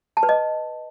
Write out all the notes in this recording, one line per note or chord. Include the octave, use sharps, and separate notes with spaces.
A5
B4
D#5